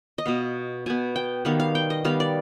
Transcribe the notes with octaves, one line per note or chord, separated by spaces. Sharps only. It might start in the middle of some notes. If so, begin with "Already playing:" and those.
D#5
B2 B3 F5
B2 B3 G#5
G5
D#3 G3 B3 F5
F5
G5
D#5
D#3 G3 B3 F5
D5